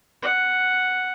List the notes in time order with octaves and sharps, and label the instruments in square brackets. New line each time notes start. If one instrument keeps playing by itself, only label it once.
[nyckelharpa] F#5